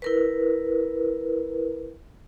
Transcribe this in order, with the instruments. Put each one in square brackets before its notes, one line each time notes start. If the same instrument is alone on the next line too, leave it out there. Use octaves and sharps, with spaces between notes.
[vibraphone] E4 A#4 B4